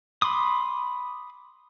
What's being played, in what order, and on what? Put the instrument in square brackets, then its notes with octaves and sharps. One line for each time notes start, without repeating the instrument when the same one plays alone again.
[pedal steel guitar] B5 C6 D6 D#6